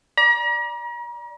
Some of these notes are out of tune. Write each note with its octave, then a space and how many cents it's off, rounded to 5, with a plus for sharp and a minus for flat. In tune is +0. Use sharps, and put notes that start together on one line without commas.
D5 +0 A#5 +40